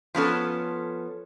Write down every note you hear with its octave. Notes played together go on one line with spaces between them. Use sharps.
F3 B3 C#4 A4